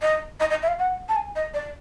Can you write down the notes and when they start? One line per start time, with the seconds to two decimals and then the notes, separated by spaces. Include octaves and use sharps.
0.02 D#5
0.40 D#5
0.50 D#5
0.62 E5
0.68 F5
0.79 F#5
1.09 A5
1.16 G#5
1.36 D#5
1.54 D5